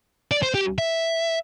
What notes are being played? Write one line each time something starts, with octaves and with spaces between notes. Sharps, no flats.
D5
C5
G4
E5